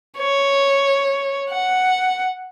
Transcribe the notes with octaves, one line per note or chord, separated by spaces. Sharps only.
C#5
F#5